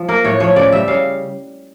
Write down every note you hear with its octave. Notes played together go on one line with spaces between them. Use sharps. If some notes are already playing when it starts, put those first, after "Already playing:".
Already playing: F3
A#3 A#4
A2 C#5
F3 C#5
C#3 D5
G3 E5
C#3 F5